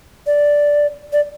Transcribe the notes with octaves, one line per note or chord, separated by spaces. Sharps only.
D5
D5